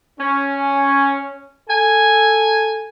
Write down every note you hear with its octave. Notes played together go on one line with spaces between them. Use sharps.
C#4
A4 G#5